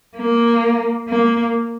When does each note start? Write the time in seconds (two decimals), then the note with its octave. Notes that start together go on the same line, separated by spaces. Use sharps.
0.17 A#3
1.08 A#3